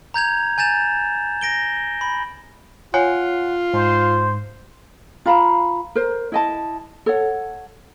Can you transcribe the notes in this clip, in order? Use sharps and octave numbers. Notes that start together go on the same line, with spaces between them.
A#5 G6 G#6 F7
G#5 G6 A6 E7 F7
A#6 D7 G7
B5
F4 C#5 F#5 G#5
G#2 C5
F4 F5 A#5 B5
A#4 C5
E4 D#5 A5
A4 C#5 F#5